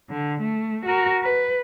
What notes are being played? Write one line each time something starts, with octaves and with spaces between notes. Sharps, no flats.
D3
A3
F#4 A#4
B4